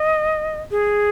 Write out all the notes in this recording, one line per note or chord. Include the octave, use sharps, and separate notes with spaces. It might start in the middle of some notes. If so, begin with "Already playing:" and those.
Already playing: D#5
G#4